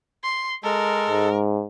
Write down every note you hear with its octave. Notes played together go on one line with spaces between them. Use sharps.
C6
G#3 A4 A#4
G#2